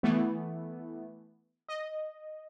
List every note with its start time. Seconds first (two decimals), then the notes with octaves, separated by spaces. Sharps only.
0.03 E3 A3 B3
1.69 D#5